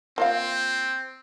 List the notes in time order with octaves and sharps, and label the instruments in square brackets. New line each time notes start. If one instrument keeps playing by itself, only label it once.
[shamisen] A#3 F4 F5 [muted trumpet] C4